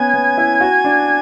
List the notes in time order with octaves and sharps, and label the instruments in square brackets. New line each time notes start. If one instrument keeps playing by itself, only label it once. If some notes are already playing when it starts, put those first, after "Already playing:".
Already playing: [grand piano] B3 C#4 [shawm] G#5
[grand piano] B3
E4
F#4
D4